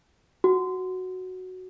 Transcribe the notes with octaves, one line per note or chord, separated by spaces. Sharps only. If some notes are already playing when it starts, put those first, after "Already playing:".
F#4